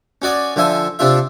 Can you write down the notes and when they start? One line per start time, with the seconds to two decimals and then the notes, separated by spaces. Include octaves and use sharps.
0.22 C#4 F#4 D5 D#6
0.56 D3 F3 E5 G#5
0.99 C3 D4 F4 E5